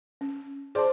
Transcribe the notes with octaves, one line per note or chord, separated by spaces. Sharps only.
C#4
G#4 C5 D5 A5